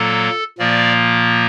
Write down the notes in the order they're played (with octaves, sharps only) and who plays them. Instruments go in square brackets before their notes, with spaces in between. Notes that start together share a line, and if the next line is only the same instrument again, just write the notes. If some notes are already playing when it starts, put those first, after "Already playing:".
Already playing: [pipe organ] A#2 F#3 A#3 A4
A#2 F3 A#3 D5